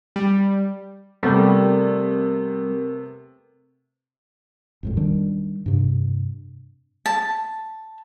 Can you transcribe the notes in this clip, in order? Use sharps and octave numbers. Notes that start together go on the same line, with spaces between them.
G3
C3 G3 A3 B3 C4 A#4
G#1 F2 A2
D#3 G3 D4
G2 C3
A5